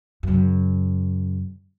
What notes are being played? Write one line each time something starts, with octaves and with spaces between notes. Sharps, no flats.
F#2 C#3